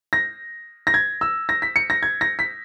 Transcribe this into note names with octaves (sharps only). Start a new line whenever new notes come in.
A#6
A#6
G#6
E6
A#6
B6
C#7
A#6
G#6
A#6
B6